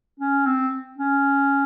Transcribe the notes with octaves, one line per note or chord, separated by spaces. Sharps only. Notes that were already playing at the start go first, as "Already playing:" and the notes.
C#4
C4
C#4